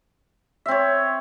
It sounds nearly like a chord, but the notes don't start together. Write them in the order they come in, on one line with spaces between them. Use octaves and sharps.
E5 C4 C#5